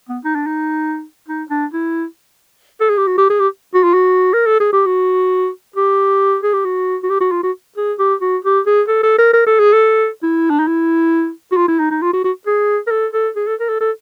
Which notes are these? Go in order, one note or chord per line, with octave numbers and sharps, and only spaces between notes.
B3
D#4
D4
D#4
D#4
D4
E4
A4
G#4
G4
F#4
G4
G#4
G4
F#4
F4
F#4
A#4
A4
G#4
G4
F#4
G4
G#4
G4
F#4
F#4
G4
F#4
F4
F#4
G#4
G4
F#4
G4
G#4
A4
A4
A#4
A#4
A4
G#4
A4
E4
D4
D#4
E4
F#4
F4
E4
D#4
D#4
F4
F#4
F#4
G#4
A#4
A4
A4
G#4
A4
A#4
A4
A4